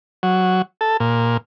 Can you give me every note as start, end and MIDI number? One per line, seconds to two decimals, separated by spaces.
0.23 0.62 54
0.81 0.97 69
1.00 1.37 46